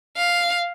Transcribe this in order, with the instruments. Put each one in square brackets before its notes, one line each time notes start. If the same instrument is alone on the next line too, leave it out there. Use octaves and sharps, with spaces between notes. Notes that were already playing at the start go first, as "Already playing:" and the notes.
[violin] F5